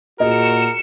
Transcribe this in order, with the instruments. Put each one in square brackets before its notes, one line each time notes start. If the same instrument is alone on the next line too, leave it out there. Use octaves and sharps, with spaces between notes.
[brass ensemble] A#2 F#4 G#4 [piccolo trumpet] A#4 [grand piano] D#5 [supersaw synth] C#7 E7